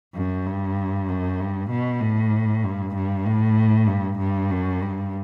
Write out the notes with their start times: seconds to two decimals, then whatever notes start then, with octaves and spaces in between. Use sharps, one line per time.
0.15 F#2
0.47 G2
1.09 F#2
1.40 G2
1.70 B2
2.01 A2
2.64 G2
2.95 G2
3.26 A2
3.88 G2
4.19 G2
4.50 F#2
4.82 G2